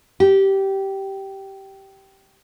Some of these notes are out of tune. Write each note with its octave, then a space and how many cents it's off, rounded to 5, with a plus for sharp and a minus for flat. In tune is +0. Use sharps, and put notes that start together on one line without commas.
G4 -15